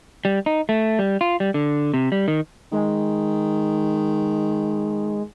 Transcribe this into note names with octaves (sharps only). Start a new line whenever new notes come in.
G3
D#4
A3
G3
F4
G3
D3
C3
G3
D#3
D#3 G#3